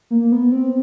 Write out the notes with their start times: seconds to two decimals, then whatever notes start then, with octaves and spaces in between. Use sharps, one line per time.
0.11 A#3
0.32 B3
0.52 C4